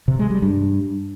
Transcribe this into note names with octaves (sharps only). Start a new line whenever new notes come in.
C3
G#3
G3
G2